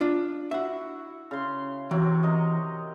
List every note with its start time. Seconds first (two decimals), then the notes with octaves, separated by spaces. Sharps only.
0.01 D4 F4
0.51 E4 F#4 E5 F#5
1.31 C#3 C6
1.91 C3 E3 F#3 F#4
2.23 C3 A#4 D#5